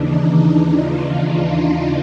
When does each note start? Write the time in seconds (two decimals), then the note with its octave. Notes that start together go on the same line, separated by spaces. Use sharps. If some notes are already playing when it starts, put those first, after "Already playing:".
Already playing: D#2 C#3 E3 D4 D#4
0.13 D4
0.70 F4